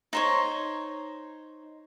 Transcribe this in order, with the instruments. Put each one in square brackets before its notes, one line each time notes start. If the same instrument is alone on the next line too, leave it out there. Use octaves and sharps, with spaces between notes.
[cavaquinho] D#4 C5 C#5